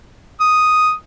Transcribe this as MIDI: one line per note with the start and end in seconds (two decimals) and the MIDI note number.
0.40 0.93 87